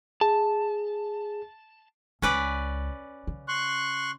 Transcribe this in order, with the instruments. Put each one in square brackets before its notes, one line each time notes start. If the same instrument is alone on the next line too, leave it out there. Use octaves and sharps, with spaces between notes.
[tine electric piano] G#4 [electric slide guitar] A5
[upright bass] C#2 [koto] C#4 B4 D5
[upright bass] C#3
[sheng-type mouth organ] C6 C#6 F#6